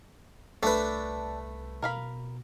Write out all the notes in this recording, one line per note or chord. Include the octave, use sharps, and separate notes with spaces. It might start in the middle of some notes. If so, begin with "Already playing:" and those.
C2 A3 D4 B4
B2 A#4 F5 B5